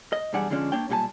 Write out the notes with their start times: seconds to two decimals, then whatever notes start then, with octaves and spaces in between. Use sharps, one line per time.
0.13 D#5
0.33 B1 E2 G3 D4 G#4 F#5
0.50 D3 F3 G#3 C#4 D4
0.72 A#3 D4 C#5 G5
0.89 B1 A#2 G3 G4 G#5 A5